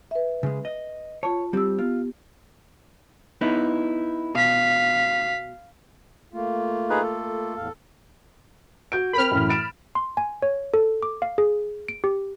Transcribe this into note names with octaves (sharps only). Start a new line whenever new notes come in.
B4 E5
C#3 G#3
D#5
F4 C#5 A5
G3 C4 G4 E6
B3 F4
B3 D#4 E4
B2 F5 B6
A3 A#3 F4
D#4 G#4 B4
A4
E2 A2 F5
F#4 G6 D7
C4 A#4 B5 F6
F#2 A2 E3
A6 D7 E7
C6
G#5
C#5
A4
D6
F5
G#4
D7
G4